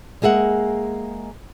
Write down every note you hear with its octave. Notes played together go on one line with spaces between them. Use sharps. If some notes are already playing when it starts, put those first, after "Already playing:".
G#3 A#3 G#4 E5 F#5